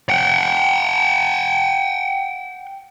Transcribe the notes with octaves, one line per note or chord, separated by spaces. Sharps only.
F#5 G5